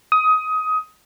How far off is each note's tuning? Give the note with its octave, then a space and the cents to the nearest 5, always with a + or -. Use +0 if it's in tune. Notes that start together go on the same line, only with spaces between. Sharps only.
D#6 +20